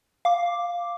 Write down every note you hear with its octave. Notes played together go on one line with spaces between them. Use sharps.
F5 D6